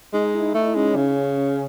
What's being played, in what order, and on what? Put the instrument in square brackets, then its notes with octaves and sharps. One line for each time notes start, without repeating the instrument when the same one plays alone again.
[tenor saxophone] G#3 [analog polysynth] D#4
[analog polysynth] E4
[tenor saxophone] A3
[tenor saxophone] G#3 [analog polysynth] C#4
[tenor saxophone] C#3
[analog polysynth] C#4